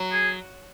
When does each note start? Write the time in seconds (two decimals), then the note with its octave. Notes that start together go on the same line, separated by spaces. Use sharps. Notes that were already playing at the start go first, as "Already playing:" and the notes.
Already playing: F#3
0.12 G#4